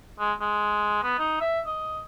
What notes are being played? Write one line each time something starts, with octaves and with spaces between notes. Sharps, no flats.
G#3
G#3
B3
D#4
E5
D#5